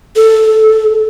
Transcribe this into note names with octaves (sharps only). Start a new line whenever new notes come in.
A4